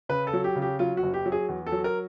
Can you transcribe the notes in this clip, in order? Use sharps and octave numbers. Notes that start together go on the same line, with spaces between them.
C#3 B4
A4
F#3
G4
C#3
G4
F#3 F4
F#4
F#1
G4
F#3
G#4
E2
A4
F#3
A#4